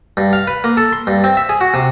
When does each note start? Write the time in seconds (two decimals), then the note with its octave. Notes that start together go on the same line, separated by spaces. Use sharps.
0.17 G2
0.33 F5
0.47 B4
0.64 A#3
0.77 A4
0.93 C6
1.07 G2
1.24 C4
1.37 E5
1.49 G#4
1.61 F#4
1.74 C3